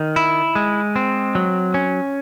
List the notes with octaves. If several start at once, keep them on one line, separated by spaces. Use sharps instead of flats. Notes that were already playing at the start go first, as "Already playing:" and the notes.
Already playing: D#3
E4
G#3
C4
F#3
C#4